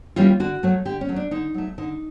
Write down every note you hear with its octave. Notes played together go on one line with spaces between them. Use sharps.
E3 G3 A#3 C#4 F4
D3 F#4
F#3 A3
D3 G4
C#4
F#3 A3
D4
D3 D#4
F#3 A3
D3 D#4